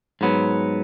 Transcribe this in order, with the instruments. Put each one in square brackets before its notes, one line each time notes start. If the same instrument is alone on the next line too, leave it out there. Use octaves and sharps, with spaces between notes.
[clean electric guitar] G#2 F#3 B3